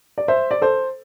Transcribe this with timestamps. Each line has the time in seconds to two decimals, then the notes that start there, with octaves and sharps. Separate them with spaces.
0.18 D5
0.28 C5 E5
0.51 D5
0.62 A4 C5